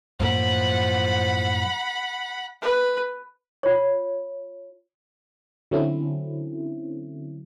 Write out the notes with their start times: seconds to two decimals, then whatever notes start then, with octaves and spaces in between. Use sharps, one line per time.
0.20 F#2 A2 F3 A#3 F#5 B5
2.62 B4
3.63 F4 C#5
5.71 D3 F#3 A3 C4 C#4 E4